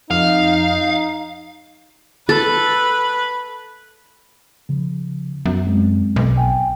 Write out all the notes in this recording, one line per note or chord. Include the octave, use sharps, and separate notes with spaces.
F2 D#4 F5
A4 B4
C#3 F3
F#2 B3
G#3 C4
B1
G5 G#5